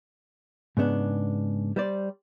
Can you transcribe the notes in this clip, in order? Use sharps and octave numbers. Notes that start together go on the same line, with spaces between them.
G#2 C#3 B3 D4
G3 C5 D5